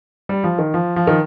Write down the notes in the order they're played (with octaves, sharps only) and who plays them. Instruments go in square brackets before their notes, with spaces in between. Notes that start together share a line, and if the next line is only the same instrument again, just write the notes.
[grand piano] G3
F3
D#3
F3
F3
D#3